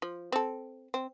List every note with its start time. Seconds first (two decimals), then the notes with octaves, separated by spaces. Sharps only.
0.02 F3
0.32 C4 A4
0.94 C4